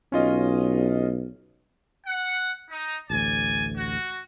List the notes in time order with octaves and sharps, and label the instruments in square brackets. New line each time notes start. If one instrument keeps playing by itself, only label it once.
[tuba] B1 [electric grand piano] C#4 F4 D#5
[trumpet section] F#5
D#4
[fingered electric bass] A1 D2 [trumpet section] D5 G#5
[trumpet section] F#4